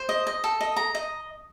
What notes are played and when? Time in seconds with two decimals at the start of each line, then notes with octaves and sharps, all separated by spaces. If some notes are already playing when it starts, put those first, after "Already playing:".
Already playing: C5
0.09 D#5
0.27 D#5
0.44 A4
0.61 D#5
0.77 A#5
0.95 D#5